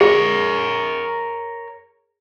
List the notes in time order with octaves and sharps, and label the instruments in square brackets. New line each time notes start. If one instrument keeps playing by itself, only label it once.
[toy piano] G#4 [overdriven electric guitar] A#4 C#5